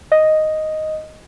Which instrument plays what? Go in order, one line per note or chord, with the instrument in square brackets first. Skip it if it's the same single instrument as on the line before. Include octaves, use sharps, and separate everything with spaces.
[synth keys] D#5